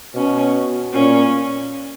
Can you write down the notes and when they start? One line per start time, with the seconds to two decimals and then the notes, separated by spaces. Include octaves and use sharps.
0.14 B2 C#4
0.93 A#2 C#4